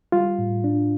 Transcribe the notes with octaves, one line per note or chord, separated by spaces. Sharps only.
G3 F4
A2
D4